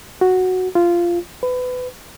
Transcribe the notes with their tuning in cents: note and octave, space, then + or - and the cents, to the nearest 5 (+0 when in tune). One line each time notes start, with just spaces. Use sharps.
F#4 -5
F4 -10
B4 +25